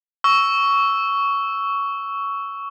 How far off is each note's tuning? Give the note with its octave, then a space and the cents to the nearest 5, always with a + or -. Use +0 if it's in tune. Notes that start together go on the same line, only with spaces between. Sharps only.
C#6 +15 E6 +0